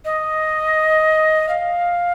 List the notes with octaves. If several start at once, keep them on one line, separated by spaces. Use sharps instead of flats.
D#5
F5